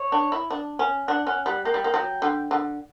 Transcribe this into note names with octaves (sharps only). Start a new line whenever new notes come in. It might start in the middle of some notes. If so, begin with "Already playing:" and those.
Already playing: C#5
D4
E4
D4
C#4
D4 F#5
C#4 F#5
G3 F#5
A#3 G5
G3
A#3
F#3
D3
D3